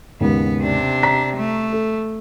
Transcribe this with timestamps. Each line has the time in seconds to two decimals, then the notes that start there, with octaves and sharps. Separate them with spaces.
0.21 D#2 G#2 C#3 B3
0.61 C3 D4
1.03 A#5 B6
1.37 A3
1.73 A4